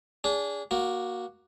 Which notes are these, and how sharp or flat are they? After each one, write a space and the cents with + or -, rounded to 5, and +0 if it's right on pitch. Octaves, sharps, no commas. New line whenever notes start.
D4 -35 G#4 -20
A#3 +15 F#4 +0